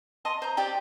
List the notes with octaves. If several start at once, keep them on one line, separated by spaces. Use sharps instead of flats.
D#5 A5 C6
C5 A#5
G4 D5 G5